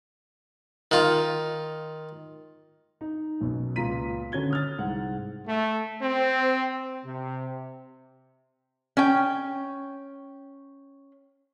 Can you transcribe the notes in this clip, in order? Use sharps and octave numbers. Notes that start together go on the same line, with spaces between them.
D#3 F4
D#4
B1 F#2 B2
C#2 A#2 B3 A#5 B6 D#7
D3 C#4 F#4 G#6 G7
D#6 F6 A6
C2 G#2 F#5
A3
C4
C3
C#4 G5